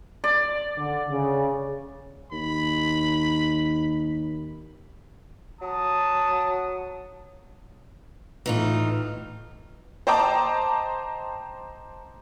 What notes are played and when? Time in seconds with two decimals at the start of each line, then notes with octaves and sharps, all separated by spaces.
0.24 D5
0.76 D3
1.09 C#3
2.32 D#2 B5
5.61 F#3 A5 D#6
8.46 A2 E3 D#4 F4
10.07 C5 D#5 G5 A5 A#5 D6